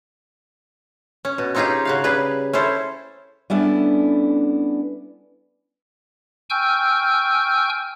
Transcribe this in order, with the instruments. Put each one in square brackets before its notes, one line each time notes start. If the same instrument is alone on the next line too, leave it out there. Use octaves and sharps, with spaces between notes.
[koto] C#4
B2
C4 C#4 D#4 F4 G4 G#4
C#3 F#4 F5
C#3 G3 G#4 B4
C#4 E4 A4 C5
[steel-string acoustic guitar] G3 B3 C#4 D4 E4 A4
[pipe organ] G5 G#5 C#6 E6 F6 G6